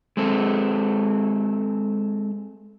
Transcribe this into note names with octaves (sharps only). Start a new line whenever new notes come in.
G#3 C4 A4